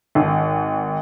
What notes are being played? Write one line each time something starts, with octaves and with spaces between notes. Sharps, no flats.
G#1